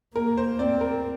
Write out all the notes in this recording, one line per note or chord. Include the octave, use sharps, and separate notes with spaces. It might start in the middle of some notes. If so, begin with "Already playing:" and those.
A#3 A#4
C5
C4 D5
A#4